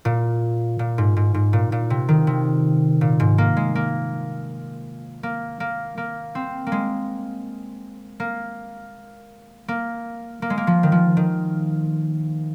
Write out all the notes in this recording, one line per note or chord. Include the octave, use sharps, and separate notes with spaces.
A#2
A#2
G#2
G#2
G#2
A#2
A#2
C3
D#3
C3
A#2
G#2
A#3
G#3
A#3
A#3
A#3
A#3
C4
A#3
G#3
A#3
A#3
A#3
G#3
A#3
F3
D#3
F3
D#3